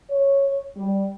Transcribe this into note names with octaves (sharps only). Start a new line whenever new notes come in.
C#5
G3